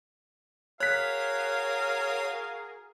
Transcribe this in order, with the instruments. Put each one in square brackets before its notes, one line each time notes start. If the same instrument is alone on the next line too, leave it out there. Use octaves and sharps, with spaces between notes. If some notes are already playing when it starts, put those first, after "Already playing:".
[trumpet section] F#4 G#4 A#4 [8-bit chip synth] C#5 [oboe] F5 [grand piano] F#6 B6